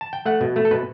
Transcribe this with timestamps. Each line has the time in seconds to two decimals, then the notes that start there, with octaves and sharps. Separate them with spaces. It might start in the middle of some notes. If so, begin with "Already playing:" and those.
0.01 A5
0.13 G5
0.26 A3 F#5
0.41 B2
0.56 A3
0.65 A4
0.71 B2 B4